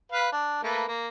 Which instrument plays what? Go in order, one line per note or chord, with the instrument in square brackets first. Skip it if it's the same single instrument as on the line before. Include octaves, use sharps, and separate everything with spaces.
[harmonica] B4 F5
D4
A3 A#3 B4
A#3